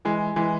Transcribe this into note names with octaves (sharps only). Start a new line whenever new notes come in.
E3 G#3
E3 G#3